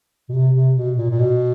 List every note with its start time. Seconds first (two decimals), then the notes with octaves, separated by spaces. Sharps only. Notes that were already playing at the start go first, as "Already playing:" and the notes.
0.29 B2
0.34 C3
0.55 C3
0.76 B2
0.97 A#2
1.10 A#2
1.19 B2